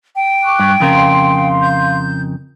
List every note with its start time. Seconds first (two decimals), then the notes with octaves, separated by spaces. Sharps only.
0.16 G5
0.43 C#6 D6 F#6
0.59 G2
0.80 F2 C#3 A#4 F5 C6
1.61 G6